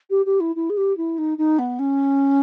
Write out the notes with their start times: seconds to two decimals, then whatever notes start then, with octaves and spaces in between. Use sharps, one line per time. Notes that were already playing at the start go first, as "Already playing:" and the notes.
0.10 G4
0.25 G4
0.40 E4
0.55 E4
0.69 G#4
0.77 G4
0.97 E4
1.18 D#4
1.38 D#4
1.58 B3
1.79 C#4